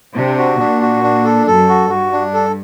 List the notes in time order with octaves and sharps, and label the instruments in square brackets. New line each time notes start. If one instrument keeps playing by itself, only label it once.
[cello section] C3 [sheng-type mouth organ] D4
[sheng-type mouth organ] F#4
[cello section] A#2 [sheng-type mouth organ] D4
[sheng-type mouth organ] F#4
D4
A4
[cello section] F#2 [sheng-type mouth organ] A4
[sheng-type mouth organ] F#4
[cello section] G2 [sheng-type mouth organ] F#4
[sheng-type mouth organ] D4
A4